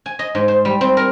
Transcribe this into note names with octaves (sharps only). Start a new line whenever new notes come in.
G#5
D#5
G#2
C5
G3
C4
A#4